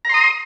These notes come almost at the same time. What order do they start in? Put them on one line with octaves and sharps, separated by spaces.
A#5 C6 D#6